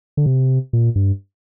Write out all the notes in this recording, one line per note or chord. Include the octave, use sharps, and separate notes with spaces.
D3
C3
A#2
G2